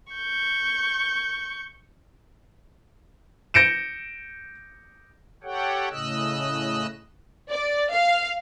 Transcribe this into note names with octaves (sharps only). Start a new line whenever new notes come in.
C#6 G6
G6 A#6 C#7 D7 E7
G4 A4 C#5 F#5 G5
A2 C#3 D#5 E6 F#6
D5
F5